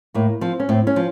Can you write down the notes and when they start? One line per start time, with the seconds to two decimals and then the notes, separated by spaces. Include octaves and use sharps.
0.14 A2 A#3
0.41 F3 C4
0.60 C#4
0.69 A2 C4
0.87 C#4
0.96 F3